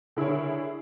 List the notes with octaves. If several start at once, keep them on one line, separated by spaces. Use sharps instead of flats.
D3 E4 G#4 A#4 C#5